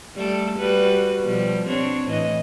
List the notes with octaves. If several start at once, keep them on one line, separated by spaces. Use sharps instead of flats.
G3 A3 A4
G3 F#4 B4
B2 F3 G3
C4 D4 C#5
A2 E3 D#5